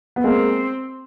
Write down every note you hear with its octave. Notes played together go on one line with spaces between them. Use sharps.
B3
G#3 A#3 C4